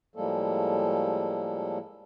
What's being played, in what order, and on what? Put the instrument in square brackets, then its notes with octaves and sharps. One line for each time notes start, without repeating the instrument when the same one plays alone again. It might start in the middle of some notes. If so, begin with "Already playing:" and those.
[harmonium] A2 F3 G3 G#3 A#3 A4